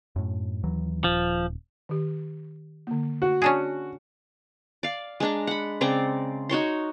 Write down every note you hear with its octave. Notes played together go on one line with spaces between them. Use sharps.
F#2 A2
D#2 E3 F#3
D#1 F3
D#3 G4
D3 A#3
F#4
C#4 D4 G#4
D5 F5
G#3 D4 A#5
F#5 B5
C#3 C4 D5 A#5
D#4 F#4 C#5 C6